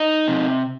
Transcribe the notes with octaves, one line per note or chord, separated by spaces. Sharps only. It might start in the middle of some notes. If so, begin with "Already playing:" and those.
Already playing: D#4
C3